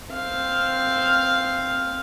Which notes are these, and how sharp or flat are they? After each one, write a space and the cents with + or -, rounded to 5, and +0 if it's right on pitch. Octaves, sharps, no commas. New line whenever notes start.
C4 +0 F5 +0